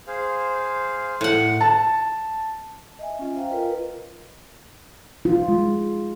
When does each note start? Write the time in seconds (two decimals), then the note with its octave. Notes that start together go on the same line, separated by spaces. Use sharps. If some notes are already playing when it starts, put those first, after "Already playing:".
0.07 G#4 C5 F5
1.21 A2 F#5
1.61 A5
2.99 D#5 E5 G#5
3.19 C#4 F4
3.36 C5 D#5 F5 G5 A#5
3.51 F4 A#4 B4
5.25 F4
5.48 G#3